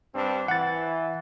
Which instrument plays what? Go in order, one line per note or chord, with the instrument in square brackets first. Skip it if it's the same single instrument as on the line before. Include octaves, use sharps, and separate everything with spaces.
[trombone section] G2 C4 D4
[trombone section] E3 [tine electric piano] F#5 A6